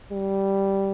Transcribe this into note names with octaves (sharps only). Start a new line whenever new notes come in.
G3